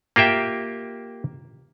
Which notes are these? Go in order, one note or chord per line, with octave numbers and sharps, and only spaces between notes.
A#3 F4 G4 E5 G5